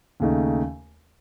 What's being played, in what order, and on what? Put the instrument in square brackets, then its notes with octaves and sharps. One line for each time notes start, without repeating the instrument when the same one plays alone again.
[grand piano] D#2 C#3 A3 D#4